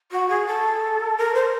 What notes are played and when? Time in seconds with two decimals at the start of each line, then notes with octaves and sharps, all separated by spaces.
0.11 F#4
0.29 G#4
0.47 A4
1.18 A#4
1.35 C5